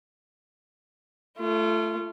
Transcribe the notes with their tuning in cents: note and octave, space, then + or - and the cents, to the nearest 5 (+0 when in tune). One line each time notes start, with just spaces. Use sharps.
A3 +0 F4 -30